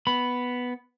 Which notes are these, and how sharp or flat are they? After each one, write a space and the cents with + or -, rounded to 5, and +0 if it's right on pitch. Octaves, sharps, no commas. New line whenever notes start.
B3 +0 B5 +0